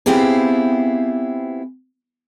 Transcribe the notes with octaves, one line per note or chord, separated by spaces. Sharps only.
B3 C4 E4 F4 G4 G#4